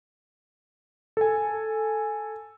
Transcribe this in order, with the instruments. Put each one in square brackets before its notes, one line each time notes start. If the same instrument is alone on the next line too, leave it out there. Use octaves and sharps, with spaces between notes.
[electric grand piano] A4 G#5